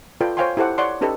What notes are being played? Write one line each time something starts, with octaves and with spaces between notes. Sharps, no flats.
F4 A4 B4 D5 G5
C5 C#5 F5 G5 G#5 C6
E4 G4 A4 C5 F#5 D6
C#5 D5 F#5 C6 D6
C#4 D#4 G4 A4 B4 D#5